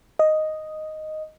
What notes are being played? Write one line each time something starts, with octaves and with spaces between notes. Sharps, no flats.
D#5